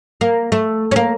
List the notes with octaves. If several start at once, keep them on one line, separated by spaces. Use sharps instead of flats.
A#3
A3
C#4
A#3